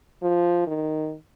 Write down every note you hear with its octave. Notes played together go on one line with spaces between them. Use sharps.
F3
D#3